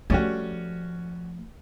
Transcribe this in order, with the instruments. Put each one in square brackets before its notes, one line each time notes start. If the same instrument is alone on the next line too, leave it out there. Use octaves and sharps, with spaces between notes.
[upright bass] F3 A3 [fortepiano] G3 C#4 F#4